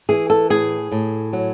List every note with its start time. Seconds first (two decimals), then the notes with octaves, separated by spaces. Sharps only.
0.09 E3 G#4
0.30 A4
0.50 A2 G#4
0.92 A2
1.33 F#3